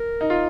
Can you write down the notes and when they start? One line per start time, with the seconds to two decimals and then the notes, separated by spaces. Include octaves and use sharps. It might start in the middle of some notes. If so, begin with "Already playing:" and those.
Already playing: A#4
0.21 D#4
0.30 F4